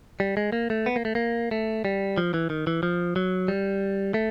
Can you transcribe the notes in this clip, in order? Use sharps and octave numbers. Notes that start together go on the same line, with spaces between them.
G3
G#3
A#3
A3
B3
A#3
A3
A#3
A3
G3
F3
E3
D#3
E3
F3
F#3
G3
A3